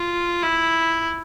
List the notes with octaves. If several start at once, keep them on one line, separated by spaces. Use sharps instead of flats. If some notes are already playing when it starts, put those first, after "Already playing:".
Already playing: F4
E4